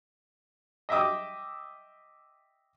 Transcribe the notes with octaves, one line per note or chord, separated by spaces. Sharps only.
D#5 E5 G5 D6 D#6